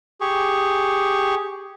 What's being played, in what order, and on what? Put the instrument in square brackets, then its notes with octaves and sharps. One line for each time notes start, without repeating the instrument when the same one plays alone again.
[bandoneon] G4 G#4 C#6